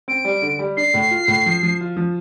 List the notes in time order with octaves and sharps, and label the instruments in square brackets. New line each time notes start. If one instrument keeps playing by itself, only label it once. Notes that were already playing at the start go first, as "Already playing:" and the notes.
[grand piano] C4 [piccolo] D7
[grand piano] G3
D3
G3
[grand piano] D4 [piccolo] C7
[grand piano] A2
F4
A2
F3
F3
F4
F3